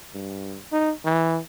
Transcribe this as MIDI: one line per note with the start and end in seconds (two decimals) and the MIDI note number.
0.14 0.59 43
0.72 0.92 63
1.05 1.40 52